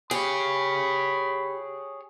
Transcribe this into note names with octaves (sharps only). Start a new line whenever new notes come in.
G4 G#4 C#5 B5